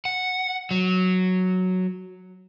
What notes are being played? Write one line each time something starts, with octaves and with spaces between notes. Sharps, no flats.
F#5
F#3